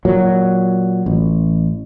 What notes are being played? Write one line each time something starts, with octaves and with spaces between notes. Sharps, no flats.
A#2 F#3
A1